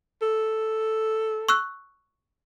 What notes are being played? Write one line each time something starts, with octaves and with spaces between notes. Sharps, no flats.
A4
C#6 E6 F#6